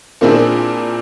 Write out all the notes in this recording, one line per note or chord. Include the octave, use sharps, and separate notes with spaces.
A#2 A#3 C4 D4 E4 G#4